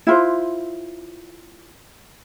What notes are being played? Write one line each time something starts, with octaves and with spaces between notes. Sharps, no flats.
E4 F4 C5